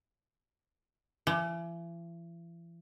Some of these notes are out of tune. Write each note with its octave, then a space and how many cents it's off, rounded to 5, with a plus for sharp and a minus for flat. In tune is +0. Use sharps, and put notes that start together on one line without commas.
E3 +40